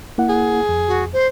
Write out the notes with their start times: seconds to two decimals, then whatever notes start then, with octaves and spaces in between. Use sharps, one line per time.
0.18 A#3 E4 F#5
0.30 G#4
0.69 F2
0.88 F#4
1.13 C5